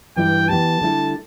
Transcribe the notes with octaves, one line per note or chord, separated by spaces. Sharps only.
G2 E3 G3 E4 G5
E3 B3 G4 A5
D3 G3 E4 A4